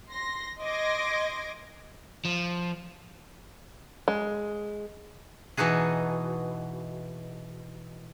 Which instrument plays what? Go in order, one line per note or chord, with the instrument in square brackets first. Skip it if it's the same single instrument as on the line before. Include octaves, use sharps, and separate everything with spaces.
[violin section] C6 A#6
D#5 C6 D6 G#6 A#6 D7
[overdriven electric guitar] F3
[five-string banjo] G#3
[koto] B2 E3 D#4 F#4 G#4